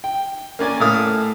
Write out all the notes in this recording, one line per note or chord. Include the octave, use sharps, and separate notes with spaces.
G5
A#3 C#4 D5 G#5
A2 A4 F5 D#6 F6